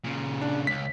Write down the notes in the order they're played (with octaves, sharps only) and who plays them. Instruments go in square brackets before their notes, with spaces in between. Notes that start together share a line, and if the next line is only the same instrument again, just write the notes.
[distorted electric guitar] A#2 C#3
[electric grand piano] D4
[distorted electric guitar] C#2 [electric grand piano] B6